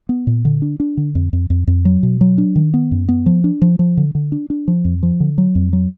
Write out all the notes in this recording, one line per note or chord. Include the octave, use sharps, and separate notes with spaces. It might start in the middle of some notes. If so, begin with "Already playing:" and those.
B3
A#2
D3
D4
D4
D3
F2
F2
F2
F2
F#3
B2
F#3
D4
D#3
B3
F#2
B3
F3
D4
F3
F3
D3
D3
D4
D4
F3
F2
F3
D3
F#3
F2
F#3